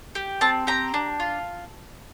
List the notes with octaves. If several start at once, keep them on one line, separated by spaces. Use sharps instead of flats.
G4
C4 A5
G4 A#5
D4
F4